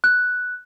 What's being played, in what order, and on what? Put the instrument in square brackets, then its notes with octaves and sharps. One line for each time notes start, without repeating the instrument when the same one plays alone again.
[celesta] F#6